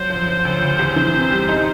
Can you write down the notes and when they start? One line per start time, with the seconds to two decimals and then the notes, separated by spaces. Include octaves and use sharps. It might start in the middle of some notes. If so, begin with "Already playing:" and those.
Already playing: F#3 C5
0.10 F3
0.27 F3
0.45 D2
0.62 D2
0.79 E2
0.96 E3
1.14 C3
1.31 G3
1.49 D#4